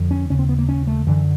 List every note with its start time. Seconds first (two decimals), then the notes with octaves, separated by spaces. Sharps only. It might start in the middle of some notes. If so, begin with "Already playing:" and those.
Already playing: F2 D3
0.11 C#4
0.30 D#2 C#3 C#4
0.39 C4
0.49 B3
0.59 A#3
0.69 C#4
0.87 A3
1.07 F#2 D3 E3